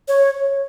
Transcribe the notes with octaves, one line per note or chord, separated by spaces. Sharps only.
C#5